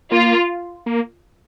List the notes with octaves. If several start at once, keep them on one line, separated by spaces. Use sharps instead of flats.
A#3 F4
A#3